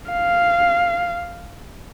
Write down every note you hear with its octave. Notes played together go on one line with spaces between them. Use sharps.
F5